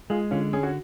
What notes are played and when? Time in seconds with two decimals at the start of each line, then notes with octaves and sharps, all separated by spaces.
0.10 G#3 F4 G#4
0.31 D3 C#4 F4
0.53 C#4 G#4
0.63 F#4